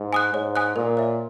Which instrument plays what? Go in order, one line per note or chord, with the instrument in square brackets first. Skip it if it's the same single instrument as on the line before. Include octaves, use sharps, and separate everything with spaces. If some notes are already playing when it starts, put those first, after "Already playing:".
Already playing: [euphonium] G#2
[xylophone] G#5 D#6 F#6
[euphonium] G#2 [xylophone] C#5
[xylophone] G#5 D#6 F#6
[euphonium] A#2 [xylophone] A#4
[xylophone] C#5 E5